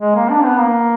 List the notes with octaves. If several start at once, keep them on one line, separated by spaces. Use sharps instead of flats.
G#3
A#3
D4
B3
A#3